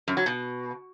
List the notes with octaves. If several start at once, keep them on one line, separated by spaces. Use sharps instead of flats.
F#2
F#3
B2